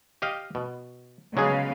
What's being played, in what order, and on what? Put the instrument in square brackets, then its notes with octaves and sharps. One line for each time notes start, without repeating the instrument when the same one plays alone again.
[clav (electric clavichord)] G4 D#5 F5
B2
[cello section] C#3 B3 F5 [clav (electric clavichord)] F#3 G#3 G#4